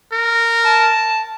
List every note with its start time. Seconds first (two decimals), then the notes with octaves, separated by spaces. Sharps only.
0.12 A#4
0.66 A5